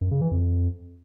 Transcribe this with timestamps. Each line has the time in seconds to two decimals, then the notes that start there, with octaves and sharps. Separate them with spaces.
0.01 F#2
0.11 C#3
0.21 E3
0.31 F2